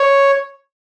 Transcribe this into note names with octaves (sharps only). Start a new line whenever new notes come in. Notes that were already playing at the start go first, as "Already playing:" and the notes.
Already playing: C#5